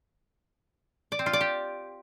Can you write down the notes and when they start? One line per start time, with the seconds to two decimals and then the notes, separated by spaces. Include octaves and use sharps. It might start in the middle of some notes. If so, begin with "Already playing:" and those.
1.12 D5
1.19 C4
1.26 F4
1.33 D5
1.41 G4